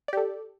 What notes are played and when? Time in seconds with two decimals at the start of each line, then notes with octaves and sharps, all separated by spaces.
0.08 D5
0.13 G4
0.17 A4